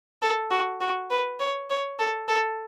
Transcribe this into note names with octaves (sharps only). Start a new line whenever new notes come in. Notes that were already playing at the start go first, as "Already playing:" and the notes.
A4
F#4
F#4
B4
C#5
C#5
A4
A4